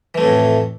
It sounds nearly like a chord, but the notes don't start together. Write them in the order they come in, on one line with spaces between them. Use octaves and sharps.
E3 A3 F2 A2